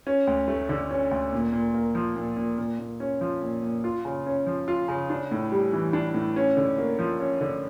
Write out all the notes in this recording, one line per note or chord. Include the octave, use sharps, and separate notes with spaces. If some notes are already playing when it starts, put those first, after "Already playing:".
C#4
D2
A3
D3
C#4
D2
A#2
A#2
A#3
F3
A#2
A#2
A#2
A#2
C#4
F3
A#2
A#2
F4
C#3
C#4
F3
F4
C#3
D4
A2
G3
E3
D4
A2
C#4
D3
A#3
F3
C#4
D3